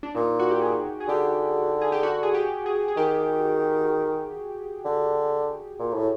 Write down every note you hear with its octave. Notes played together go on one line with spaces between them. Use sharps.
D4
A#2 D#4
F#4
G4
G#4
G#4
D3 G4
G#4
G4
F#4
G#4
G4
G#4
G#4
D#3 G4
D3
A#2
A2